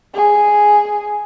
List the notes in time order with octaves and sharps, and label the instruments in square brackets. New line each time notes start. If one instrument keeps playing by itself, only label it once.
[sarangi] G#4